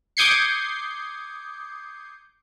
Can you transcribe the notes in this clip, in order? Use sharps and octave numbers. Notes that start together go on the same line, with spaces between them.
D6 D#6 G6 G#6 C7 C#7